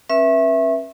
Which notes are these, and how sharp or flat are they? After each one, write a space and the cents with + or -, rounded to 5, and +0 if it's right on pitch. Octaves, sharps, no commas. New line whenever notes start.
C#4 -35 B4 -35 E5 +0